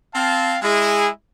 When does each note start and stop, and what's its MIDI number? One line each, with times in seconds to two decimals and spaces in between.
0.14 0.57 60
0.14 0.57 77
0.14 0.57 81
0.62 1.07 56
0.62 1.07 64
0.62 1.07 68